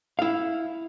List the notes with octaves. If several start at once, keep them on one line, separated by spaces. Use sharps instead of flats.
E4 F5